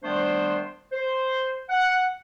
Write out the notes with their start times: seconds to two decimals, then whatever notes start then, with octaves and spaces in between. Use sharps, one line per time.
0.03 D#3 G3 A3 B3 D4 C5
0.92 C5
1.69 F#5